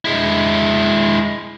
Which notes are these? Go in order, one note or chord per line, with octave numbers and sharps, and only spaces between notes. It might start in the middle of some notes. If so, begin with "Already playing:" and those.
G#3 E4